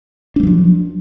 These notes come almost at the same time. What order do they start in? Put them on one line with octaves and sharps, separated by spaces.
D4 A3 F#3 F3